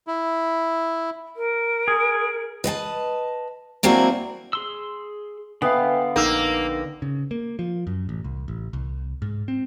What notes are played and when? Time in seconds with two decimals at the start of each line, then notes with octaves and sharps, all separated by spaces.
0.07 E4
1.36 A#4
1.88 G#4
2.64 B4 D#5 G5 A5
3.83 F#3 A#3 C4 D4 E4 F#4
4.53 G#4 C6 E6
5.62 D3 B3 E5 F5 G5 G#5
6.16 A#1 A#3 D#4 G5 E6
7.02 C#3
7.31 A#3
7.59 F3
7.87 F#2
8.09 A1
8.24 C2
8.48 A1
8.73 C2
9.22 G#2
9.48 C4